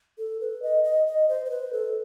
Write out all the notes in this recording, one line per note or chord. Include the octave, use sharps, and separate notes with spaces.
A4
B4
D#5
D#5
D#5
C5
C5
B4
A4